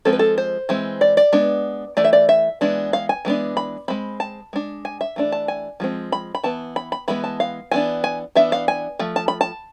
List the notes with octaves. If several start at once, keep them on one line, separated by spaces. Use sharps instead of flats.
F3 G#3 C4 A4
B4
A4
C5
E3 G#3 C4
D5
D5
G#3 B3 D4
E3 A3 D5
E5
D5
E5
E3 G#3 B3 D4
F5
G#5
E3 G#3 B3 D4
B5
G#3 C4 B5
A5
G#3 D4
G#5
E5
E3 A3 D4
A5
G#5
F3 G#3 C4
B5
B5
E3 B3 A5
B5
B5
E3 G#3 B3 B5
A5
F5
E3 B3 D4 G#5
G#5
E3 B3 D4 E5
F5
G#5
F3 A3
A5
B5
A5